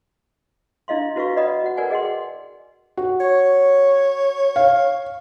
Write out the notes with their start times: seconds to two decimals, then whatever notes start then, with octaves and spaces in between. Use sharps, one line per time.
0.88 D4 E4 D#5 F5 C6
1.16 E4 F#4 B4 D#5 F5 C#6
1.37 B4 D5 D#5 F#5 B5 D#6
1.64 F#4 F#5
1.77 A#4 B4 D5 F#5 G#5
1.90 G#4 D#5 F#5 G5 C6
2.97 F#4
3.20 C#5
4.56 F5